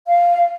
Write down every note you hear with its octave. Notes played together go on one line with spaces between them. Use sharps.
F5